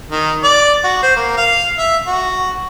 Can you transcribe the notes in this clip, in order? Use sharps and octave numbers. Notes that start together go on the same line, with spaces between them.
D#3
D5
F#4
C5
A#3
F5
E5
F#4